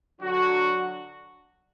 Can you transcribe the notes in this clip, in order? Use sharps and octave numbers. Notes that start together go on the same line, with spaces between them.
D3 F#3 D4 F#4